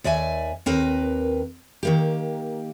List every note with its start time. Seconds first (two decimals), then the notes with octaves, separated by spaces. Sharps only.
0.04 D#2 D5 E5 G#5
0.66 D#2 C4 A#4 B4
1.83 D#3 A#3 G4